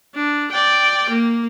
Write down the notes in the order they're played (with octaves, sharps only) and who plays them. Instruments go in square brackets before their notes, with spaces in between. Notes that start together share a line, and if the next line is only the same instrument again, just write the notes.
[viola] D4
D5 G5
A#3